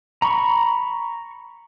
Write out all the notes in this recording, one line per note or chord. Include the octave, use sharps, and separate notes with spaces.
A#5 B5 C#6